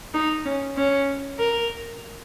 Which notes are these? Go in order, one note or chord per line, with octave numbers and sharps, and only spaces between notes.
D#4
C#4
C#4
A#4